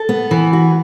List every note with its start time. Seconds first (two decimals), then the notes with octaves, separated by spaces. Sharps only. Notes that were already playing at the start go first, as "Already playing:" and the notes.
Already playing: A4
0.09 B3
0.31 E3
0.53 F#4